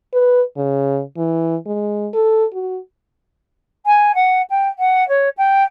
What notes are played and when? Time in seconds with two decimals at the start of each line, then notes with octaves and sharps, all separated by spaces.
0.13 B4
0.57 C#3
1.17 E3
1.66 G#3
2.14 A4
2.53 F#4
3.86 G#5
4.14 F#5
4.49 G5
4.78 F#5
5.08 C#5
5.37 G5